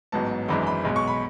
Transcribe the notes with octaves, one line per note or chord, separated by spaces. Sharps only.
A1 G#2 F#3 B3 A5
G#1 F#2 E3 G#3 D4 B5
B5
B1 B2 G#3
C#6
B5